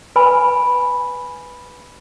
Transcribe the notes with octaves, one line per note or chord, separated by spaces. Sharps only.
B4 G#5 B5